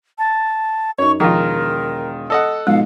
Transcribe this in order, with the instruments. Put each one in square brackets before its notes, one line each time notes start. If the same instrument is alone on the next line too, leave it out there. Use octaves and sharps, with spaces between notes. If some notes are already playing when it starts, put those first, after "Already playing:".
[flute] A5
[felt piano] F#2 D#4 [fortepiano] C#5 [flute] C#6
[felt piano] E1 [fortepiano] D#3 F4 [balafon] F3 [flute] A#4
[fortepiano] A4 D#5 F#5
[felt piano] G#2 B2 F3 [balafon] G#3 [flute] F5